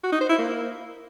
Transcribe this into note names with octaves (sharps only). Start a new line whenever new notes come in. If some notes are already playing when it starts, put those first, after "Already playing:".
F#4
D#4
C5
E4
A#3